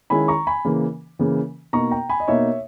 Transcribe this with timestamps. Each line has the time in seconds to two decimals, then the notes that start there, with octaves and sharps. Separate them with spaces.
0.10 D#3 G#3 C#4 E4 G#5 B5
0.28 A#5 C#6
0.47 G#5 B5
0.65 C#3 E3 A#3
1.19 C#3 E3 A#3
1.73 B2 A#3 D#4 A#5 C#6
1.91 G5 A#5
2.10 G#5 B5
2.20 D#5
2.28 B2 A#3 D#4 C#5 E5